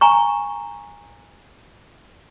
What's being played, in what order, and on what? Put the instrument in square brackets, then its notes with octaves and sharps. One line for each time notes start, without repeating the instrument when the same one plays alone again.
[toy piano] G#5 A#5 C#6